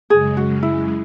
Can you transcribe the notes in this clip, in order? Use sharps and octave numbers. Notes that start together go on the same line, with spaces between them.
F#2 C#3 G#3 G#4
F#4
E4